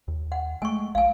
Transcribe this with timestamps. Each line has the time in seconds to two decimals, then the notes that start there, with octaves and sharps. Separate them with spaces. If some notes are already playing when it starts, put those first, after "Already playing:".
0.08 D#2
0.32 F#5
0.62 G#3 A3 G#5 C#6
0.95 A#1 F5 G#5